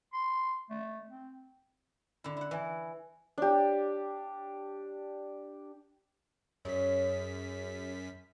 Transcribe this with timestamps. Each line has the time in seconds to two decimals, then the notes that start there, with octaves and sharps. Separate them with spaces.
0.13 C6
0.70 A3
1.09 C4
2.24 D3 E4
2.37 E4 F#5
2.51 E3 B4 E5 G#5
3.38 D4 G4
6.65 F#2 F#3 C#4 G#4 B6